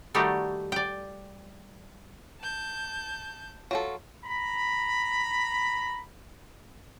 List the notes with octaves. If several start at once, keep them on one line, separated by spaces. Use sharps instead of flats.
D#3 G3 A3 D#4 F#4 G4
D5 G5
A5 G6
F#3 F4 A4
A#5 B5